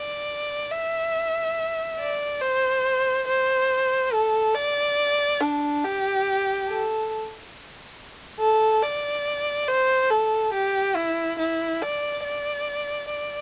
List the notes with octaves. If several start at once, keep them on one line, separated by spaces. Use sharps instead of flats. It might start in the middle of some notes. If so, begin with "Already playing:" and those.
Already playing: D5
E5
D5
C5
C5
A4
D5
D4
G4
A4
A4
D5
C5
A4
G4
E4
E4
D5
D5
D5